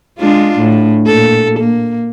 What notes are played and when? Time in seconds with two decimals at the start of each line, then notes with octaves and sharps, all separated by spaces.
0.19 G#3 D4 F4
0.59 A2
1.07 A#2 A4
1.59 A#3